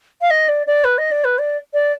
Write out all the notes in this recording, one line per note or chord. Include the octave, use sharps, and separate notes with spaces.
F5
D#5
D5
D5
B4
D#5
D5
B4
D5
D5